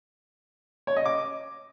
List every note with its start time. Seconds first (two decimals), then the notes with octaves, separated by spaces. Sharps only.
0.87 C#5
0.96 D#5
1.05 D6